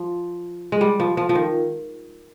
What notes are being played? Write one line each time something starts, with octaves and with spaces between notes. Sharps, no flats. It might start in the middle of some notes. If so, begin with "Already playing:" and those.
Already playing: F3
G#3
G3
F3
F3
F3
D#3